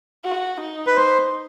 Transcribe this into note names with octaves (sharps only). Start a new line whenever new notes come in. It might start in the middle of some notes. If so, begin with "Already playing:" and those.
F#4
D#4
B4
D#4 C5